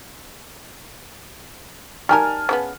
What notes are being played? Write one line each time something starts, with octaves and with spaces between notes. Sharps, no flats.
D#3 G3 A#4 G#5 A5 F6
C#3 F#3 B3